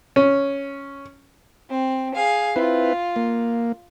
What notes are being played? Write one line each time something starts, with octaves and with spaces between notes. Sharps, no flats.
C#4
C4
G#4 F5
C4 E4 F4 B4
A#3